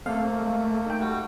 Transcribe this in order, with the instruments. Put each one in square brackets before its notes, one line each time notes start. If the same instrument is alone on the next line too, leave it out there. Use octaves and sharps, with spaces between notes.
[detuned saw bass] A3 [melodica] A#3 A4 [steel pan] C4 [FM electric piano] F5
[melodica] A#3
[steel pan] G#3
D#4 G5
[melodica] G3 F#4